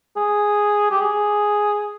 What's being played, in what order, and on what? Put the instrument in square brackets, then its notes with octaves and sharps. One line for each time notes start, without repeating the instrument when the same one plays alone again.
[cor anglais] G#4
G4
G#4